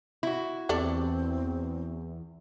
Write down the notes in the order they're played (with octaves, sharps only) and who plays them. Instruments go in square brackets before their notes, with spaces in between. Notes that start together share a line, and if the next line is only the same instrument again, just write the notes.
[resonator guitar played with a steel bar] E4 F#4
[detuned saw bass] E2 [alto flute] C4 [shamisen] G4 A4 D5